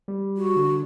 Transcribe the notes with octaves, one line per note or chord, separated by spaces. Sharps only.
G3
F#4
D3